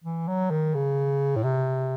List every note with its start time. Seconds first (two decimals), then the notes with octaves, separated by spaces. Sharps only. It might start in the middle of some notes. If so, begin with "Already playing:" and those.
0.04 E3
0.28 F#3
0.50 D#3
0.74 C#3
1.36 A2
1.43 C3